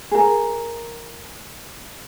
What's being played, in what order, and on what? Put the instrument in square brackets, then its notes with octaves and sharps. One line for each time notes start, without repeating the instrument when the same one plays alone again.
[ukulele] G#4 A#4